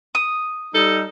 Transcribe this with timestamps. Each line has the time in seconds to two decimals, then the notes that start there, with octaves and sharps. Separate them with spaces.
0.15 D#6
0.75 G3 D#4 A4